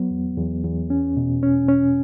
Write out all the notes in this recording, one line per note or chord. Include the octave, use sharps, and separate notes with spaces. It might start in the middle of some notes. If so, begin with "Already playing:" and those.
Already playing: F#3 B3
E2
E2
E2
C#4
B2
C#4
C#4